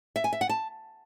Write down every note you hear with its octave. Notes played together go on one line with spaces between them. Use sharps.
E5
G#5
E5
F#5
A5